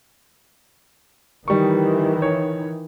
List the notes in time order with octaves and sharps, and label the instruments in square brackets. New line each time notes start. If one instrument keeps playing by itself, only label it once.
[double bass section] D#3 E3 [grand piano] G3 C#6
[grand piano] C#5